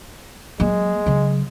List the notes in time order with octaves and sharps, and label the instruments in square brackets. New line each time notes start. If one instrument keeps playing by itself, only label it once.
[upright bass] F#3 A#3 [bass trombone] G#3
[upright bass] C#3 F#3